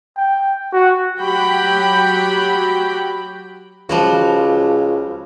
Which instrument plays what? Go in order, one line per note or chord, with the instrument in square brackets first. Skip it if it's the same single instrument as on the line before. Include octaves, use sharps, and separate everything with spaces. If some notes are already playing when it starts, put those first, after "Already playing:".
[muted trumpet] G5
F#4
[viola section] F#3 F#4 G4 G5 B5
[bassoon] C#2 [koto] F3 G3 F#4